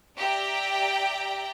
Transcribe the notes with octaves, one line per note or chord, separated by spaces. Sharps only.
G4 D5 E5 G5 A#5